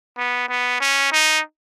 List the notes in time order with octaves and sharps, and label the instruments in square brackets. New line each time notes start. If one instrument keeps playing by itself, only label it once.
[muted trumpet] B3
B3
C#4
D#4